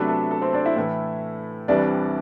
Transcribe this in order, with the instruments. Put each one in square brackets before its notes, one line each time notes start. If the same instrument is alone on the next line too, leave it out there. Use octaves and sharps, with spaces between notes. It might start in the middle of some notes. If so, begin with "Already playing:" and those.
Already playing: [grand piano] C3 F#3 A3 B3 D4 B4
A4
A4
C4 C5
D4 D5
E4 E5
A2 E3 A3
C2 C3 E3 G3 D4 D5